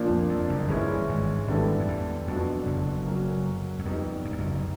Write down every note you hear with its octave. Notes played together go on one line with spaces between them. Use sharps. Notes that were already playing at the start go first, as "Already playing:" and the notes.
Already playing: A#2 F3 A#3 D4
F2
F2
F#1 F#2
G1 G2 E3 G#3 C#4 E4
G#1 G#2
G#1 G#2 D3 G3 B3 E4 A4
F2
E2
F2 B2 F#3 B3 D4 F#4
F#1 F#2
F#3 A#3 C#4 F#4
E2
F2 G3 B3 D#4
F#2
F2
F#1 F#2